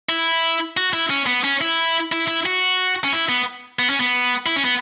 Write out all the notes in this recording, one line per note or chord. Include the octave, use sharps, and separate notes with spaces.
E4
F#4
E4
C#4
B3
C#4
E4
E4
E4
F#4
C#4
E4
B3
B3
C#4
B3
E4
C#4
B3